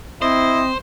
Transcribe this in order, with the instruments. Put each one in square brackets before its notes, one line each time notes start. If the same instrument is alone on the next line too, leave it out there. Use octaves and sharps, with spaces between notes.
[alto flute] C4 [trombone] E4 [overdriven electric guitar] C5 [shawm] D#5